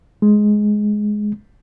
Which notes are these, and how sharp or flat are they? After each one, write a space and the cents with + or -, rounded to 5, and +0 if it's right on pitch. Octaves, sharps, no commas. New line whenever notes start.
G#3 +10